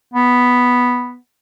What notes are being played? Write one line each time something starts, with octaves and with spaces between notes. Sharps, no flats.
B3